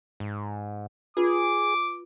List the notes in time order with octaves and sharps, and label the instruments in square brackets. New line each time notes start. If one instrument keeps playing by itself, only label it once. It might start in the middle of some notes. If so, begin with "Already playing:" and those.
[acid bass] G#2
[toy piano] F4 B4 B5 [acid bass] G#4 [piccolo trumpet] D6